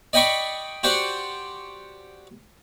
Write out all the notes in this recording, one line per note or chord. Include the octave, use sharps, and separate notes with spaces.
D5 D#5 G5 B5 C#6 D6
F#4 G4 C5 D5 F#5